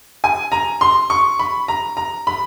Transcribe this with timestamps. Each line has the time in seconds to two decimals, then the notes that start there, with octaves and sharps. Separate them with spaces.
0.24 G#5
0.52 A#5
0.81 C6
1.10 C#6
1.39 B5
1.68 A#5
1.97 A#5
2.27 B5